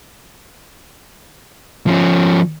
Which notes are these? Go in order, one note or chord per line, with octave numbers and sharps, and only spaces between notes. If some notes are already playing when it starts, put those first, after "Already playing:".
F3 C#4